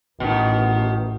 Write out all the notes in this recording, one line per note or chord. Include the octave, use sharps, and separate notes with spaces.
A1 B2 D#3